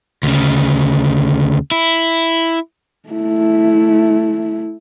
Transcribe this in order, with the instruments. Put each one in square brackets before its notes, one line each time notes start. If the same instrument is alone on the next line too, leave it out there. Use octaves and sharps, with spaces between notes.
[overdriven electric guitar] D2 C#3
E4
[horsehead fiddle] A3 E4